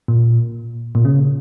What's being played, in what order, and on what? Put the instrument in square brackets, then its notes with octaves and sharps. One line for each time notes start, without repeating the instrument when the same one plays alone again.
[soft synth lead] A#2
A#2
C#3